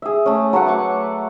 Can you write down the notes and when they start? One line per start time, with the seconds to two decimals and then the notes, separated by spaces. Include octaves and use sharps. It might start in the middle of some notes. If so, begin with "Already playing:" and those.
0.02 G#4 E5
0.26 A3 C#4
0.53 F#3 A3 B4 F#5
0.66 F#5 C#6 D6